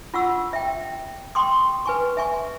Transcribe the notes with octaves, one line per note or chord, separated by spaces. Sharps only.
F4 F#5 C#6 E6
E5 G5
G5 C6 C#6 D#6
B4 G#5 C#6
E5 G#5 C#6